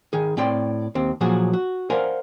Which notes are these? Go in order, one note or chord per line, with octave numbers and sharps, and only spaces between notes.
D#3 G#4
A2 C4 D5 G5 C6
D#2 C4
A#2 F3 F#3 F#4 G#4
F#4
A#4 C5 D5 F5 F#5 G#5